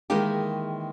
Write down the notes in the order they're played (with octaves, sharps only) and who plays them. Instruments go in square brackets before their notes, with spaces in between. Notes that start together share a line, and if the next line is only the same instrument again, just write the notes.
[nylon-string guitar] D#3 E3 G#3 A#3 D#4 G4